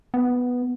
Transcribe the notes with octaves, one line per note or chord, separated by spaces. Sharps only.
B3